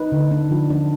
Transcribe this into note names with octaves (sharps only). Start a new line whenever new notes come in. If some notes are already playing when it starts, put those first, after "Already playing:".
Already playing: D#4 B4
D3
D4
F3
D4